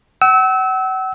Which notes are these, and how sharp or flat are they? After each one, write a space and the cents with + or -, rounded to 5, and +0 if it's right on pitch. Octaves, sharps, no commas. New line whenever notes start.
F#5 +40 E6 -25